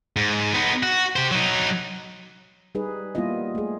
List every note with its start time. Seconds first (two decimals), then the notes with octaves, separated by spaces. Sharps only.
0.16 G#2
0.54 B3 D#4
0.83 F#4
1.16 G4 C5
1.31 F#3 D#4
2.75 G3 D#4 G#4 B4
3.15 G3 A#3 B3 E4 F4 D#5
3.55 A3 G#4